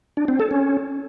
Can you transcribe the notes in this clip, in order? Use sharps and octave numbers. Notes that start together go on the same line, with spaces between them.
D4
C4
A4
C#4